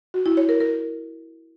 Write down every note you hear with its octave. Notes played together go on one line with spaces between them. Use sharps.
F#4
E4
C#5
A#4
A#4